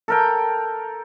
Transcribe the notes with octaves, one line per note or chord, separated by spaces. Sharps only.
A4 A#4 G5